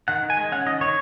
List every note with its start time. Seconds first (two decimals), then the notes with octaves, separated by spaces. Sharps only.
0.08 D#3 F#5
0.23 D#3
0.30 G#5
0.37 G#3
0.52 C#4 F#5
0.66 D#3 D#5
0.81 D#3 C#5